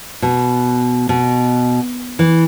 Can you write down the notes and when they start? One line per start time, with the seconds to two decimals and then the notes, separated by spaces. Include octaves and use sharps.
0.22 B2
1.09 B2
2.19 E3